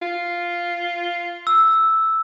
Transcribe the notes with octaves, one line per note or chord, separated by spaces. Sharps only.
F4
E6